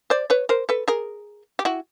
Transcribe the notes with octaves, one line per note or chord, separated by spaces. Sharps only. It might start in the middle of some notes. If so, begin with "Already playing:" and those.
C5 D5
B4 C#5
A#4 C5
A4 B4
G#4 A#4
G4
E4 F#4